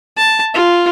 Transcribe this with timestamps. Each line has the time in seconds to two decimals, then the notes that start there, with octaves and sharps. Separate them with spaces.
0.17 A5
0.54 F4